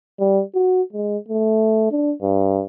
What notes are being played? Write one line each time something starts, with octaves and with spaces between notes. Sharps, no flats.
G3
F#4
G#3
A3
D4
G2